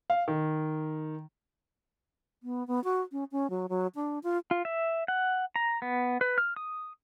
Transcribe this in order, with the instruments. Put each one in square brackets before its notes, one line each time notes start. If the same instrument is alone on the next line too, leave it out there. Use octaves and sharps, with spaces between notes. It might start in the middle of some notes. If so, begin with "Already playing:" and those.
[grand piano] F5
D#3
[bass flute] B3
B3
F#4
C#4
C#4
F#3
F#3
D4
F4
[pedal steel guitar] F4
E5
F#5
A#5
B3
B4
F6
D#6